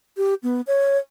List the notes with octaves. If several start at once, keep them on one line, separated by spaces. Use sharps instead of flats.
G4
B3
C#5